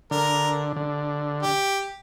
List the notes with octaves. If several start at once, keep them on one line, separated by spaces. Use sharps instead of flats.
D3 A#4
D3
G4